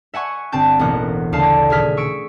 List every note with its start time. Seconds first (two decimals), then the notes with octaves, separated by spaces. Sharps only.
0.14 E5 F#5 G#5 C#6
0.52 G1 C4 G5 A5 G6
0.79 E1 A1 A#3 B3 F#5
1.33 D2 C#3 F5 A5 C7
1.70 D#1 G#4 E5 F6 B6
1.97 C#6 E6 C#7 D7